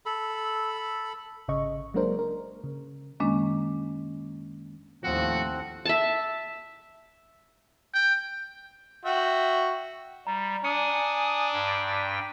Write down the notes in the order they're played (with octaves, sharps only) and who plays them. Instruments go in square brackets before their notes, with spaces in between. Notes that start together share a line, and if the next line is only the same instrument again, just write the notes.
[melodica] A4 B5
[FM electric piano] G#1 C#3 D#5 C#6
F#3 G#3 A#3 D4 A#4 C5
A#4
C#3
[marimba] F#2 D#3 G#3 A#3 C#4 D4
[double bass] D#2 [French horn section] A2 F3 [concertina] C4 F#5 [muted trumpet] F#4
[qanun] E5 A5
[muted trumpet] G5
[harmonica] F#4 E5 G5
[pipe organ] G3 [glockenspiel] A#5
[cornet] D4 [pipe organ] G#5 D#6 [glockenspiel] C#7
[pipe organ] G2 G5
[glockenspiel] B6 D#7